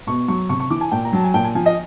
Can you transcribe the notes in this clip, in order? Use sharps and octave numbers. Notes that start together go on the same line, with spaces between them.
B2 C#6
F#3 C#6
C3 C#6
C#6
E3 D6
G#5
A#2 G5
A#5
F#3 A5
G#5
A#2 G5
G#5
F3 G#5
D#5